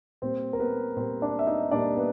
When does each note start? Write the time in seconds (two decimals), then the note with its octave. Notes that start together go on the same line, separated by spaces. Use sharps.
0.22 A#2 G3 A#3 C4 C5
0.53 A#4
0.60 B3 B4
0.97 A#2 G3 A#3 C4 C5
1.22 D4 D5
1.39 E5
1.47 D#4 D#5
1.71 A#2 G3 A#3 D4 D5
1.97 B3 B4